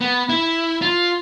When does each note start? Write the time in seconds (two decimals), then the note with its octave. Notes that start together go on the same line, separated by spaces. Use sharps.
0.01 B3
0.29 E4
0.82 F4